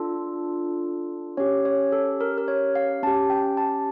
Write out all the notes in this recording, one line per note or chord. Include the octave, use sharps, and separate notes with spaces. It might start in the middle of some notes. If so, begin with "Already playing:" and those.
Already playing: D4 F4 A4
C#4 G4 C#5
C#5
A4
A#4
A#4
C#5
F5
C#4 G4 A5
G5
A5